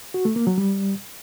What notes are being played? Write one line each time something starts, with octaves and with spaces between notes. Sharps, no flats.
F#4
A3
A#3
F#3
G3